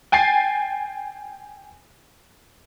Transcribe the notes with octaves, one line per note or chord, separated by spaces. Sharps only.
G5 G#5 A6 C7